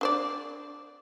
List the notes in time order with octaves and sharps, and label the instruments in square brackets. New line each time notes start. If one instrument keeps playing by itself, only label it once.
[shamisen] D4 C5 D5